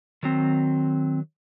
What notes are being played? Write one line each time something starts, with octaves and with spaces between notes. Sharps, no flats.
D#3 F#3 C4